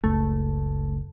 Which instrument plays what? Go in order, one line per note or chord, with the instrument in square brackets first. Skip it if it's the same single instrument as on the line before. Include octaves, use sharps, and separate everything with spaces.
[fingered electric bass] F#1 C#2 [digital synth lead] A3